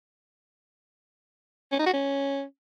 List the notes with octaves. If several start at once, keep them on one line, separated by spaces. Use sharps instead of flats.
C#4
D#4
F#4
C#4